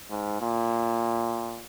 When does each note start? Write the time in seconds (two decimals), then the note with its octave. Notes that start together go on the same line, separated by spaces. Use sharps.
0.10 G#2
0.41 A#2